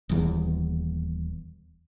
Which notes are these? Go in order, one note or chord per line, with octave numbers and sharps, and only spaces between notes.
D#1 E2